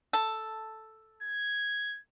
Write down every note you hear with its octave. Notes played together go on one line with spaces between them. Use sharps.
A4
G#6